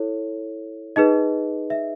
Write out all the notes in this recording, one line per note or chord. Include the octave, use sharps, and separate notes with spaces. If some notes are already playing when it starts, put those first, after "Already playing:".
Already playing: E4 A4 C#5
D#4 G#4 B4 D#5
E5